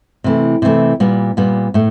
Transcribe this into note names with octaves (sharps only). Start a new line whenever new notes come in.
C3 E3 A3
C3 E3 A3
A#2 G3 B3
A#2 G3 B3
A2 A3